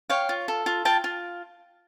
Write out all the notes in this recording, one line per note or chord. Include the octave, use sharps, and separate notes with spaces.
C#5 F5 G5
F4
A4
F4
F4 G5 A5
F4